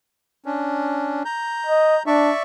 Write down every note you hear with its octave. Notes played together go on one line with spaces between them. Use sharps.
C#4 D4
A#5 G6
D#5
D4 D5 E5 C#6